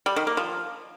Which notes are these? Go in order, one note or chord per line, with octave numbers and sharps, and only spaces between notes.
G3
D#3
A#3
F3